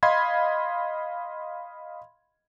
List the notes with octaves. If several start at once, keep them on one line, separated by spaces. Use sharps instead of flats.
D#5 F5 B5 C6 G#6